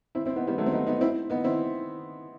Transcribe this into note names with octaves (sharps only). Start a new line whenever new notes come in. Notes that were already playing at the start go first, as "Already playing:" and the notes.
C4 E4
C4 E4
B3 D#4
G3 B3
F#3 A3
C4
B3 D#4
B3 D#4
C4 E4
B3 D#4
C4 E4